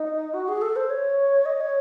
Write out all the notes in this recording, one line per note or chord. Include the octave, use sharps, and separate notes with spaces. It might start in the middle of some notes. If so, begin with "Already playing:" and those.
Already playing: D#4
F#4
G#4
A4
C5
C#5
D#5
C#5